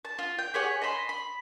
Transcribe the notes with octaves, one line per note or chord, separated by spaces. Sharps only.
A5
F4
G5
G4 G#4 C#5 F#5
D#5 A5 B5 C6
B5